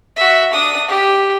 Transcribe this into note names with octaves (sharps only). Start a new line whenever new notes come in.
F#4 E5
D4 D#6
G4